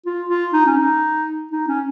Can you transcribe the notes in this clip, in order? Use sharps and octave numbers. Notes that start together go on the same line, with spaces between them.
F4
F4
D#4
C#4
D#4
D#4
C#4